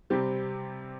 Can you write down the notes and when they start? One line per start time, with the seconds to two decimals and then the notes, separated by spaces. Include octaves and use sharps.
0.10 C3 G3 C4 G4